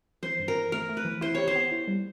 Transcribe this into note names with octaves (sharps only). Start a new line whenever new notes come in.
E3 C5
G2
A#4
E3
A3 A#4
A3
B4
E3
E4 C5
G4 C#5
C5
B3
E4
G3